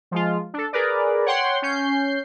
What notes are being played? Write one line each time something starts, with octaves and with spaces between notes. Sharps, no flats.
F3 G#3 F4
D4 A4
G#4 A#4 B4 D5
C#5 F#5 G5 C6
C#4 G6 C7